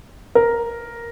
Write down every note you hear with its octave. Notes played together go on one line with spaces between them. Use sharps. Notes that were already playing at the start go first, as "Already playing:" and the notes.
A#4